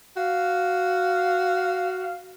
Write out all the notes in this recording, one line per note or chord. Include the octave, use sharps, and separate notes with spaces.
F#4 F5